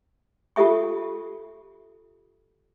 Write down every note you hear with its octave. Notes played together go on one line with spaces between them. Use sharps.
F4 G4 A4 E5 C#6